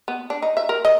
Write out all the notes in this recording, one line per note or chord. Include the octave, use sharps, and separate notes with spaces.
B3
D4
D#4
E5
A#4
D#5